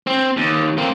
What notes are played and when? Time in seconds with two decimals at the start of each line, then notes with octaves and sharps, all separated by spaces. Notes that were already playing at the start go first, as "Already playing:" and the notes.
0.07 C4
0.37 D#2
0.78 A#3 C4